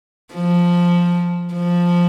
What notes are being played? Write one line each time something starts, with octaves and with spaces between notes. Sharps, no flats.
F3
F3